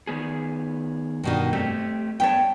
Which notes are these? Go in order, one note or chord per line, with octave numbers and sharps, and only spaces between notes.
D#3 B3 G#4
G2 B2 D#3
A3 C4 G4
G2 B3 C#5 G5 A5